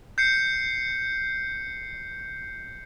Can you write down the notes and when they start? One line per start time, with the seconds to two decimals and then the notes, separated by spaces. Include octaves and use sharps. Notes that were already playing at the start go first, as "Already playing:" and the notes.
0.18 G6 C7 C#7